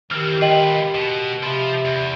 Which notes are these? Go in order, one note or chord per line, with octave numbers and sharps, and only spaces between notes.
D#3 E3 C4 G4 F6
F4 B4 D#5 G5 F#7
B2
C3 F3 B5
E2